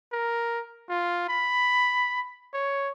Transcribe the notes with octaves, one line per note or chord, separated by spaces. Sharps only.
A#4
F4
B5
C#5